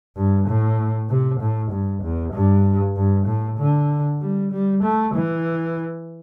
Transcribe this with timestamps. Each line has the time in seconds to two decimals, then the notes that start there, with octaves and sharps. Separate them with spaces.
0.17 G2
0.47 A2
1.10 C3
1.40 A2
1.71 G2
2.03 E2
2.33 G2
2.96 G2
3.27 A2
3.59 D3
4.21 G3
4.52 G3
4.83 A3
5.15 E3